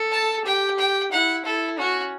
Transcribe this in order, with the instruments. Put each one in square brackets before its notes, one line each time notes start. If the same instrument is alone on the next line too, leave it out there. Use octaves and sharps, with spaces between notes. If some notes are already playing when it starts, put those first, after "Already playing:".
Already playing: [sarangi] A4
[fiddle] A5
[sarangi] G4 [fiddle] G5
[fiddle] G5
[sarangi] E4 [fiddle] F#5
[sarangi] E4 [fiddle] A4
[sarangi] C#4 [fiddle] F#4